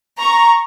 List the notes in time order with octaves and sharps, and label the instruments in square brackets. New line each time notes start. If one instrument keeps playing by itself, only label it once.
[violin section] A#5 C#6